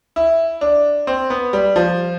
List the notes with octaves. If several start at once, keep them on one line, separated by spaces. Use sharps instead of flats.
E4
D4
C4
B3
G3
F3